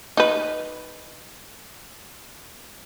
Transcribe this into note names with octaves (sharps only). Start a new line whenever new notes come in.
D#4 B4